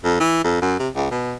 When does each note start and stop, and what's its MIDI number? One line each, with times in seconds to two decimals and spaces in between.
0.04 0.17 41
0.20 0.43 52
0.44 0.57 41
0.62 0.76 42
0.79 0.89 48
0.95 1.07 37
1.11 1.34 47